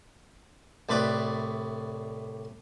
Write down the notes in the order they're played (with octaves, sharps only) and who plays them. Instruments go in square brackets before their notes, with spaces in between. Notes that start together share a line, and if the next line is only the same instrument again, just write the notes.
[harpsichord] C2 A2 B4 D5